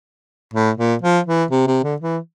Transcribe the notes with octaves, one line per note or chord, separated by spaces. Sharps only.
A2
A#2
F3
E3
C3
C3
D3
E3